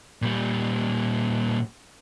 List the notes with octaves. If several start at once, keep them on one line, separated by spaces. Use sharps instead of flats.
A#2 G3